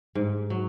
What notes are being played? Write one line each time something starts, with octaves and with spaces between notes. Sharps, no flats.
G#2
F#3